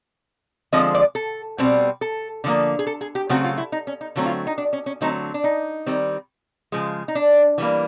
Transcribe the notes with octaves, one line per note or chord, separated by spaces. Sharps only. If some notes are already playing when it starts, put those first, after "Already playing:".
D3 F3 G#3 C4 D#5
D5
A4
B2 G3 C4
A4
D3 F3 A#3
G#4
A4
G#4
G4
C#3 F#3 A3 C4 F#4
F4
E4
D#4
C#4
D#4
D3 F#3 A3 C4
F4
D#4
D4
C#4
C#4
D3 F#3 A3 C4 D#4
D4
D#4
D#3 G3 C4
C#3 F3 G#3
D#4
D4
E3 G3 A#3